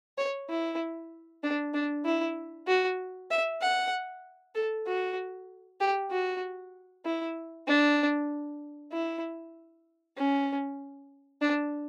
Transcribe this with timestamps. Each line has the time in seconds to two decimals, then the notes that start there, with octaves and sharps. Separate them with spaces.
0.18 C#5
0.49 E4
1.43 D4
1.74 D4
2.05 E4
2.67 F#4
3.31 E5
3.62 F#5
4.55 A4
4.87 F#4
5.80 G4
6.11 F#4
7.05 E4
7.67 D4
8.92 E4
10.17 C#4
11.42 D4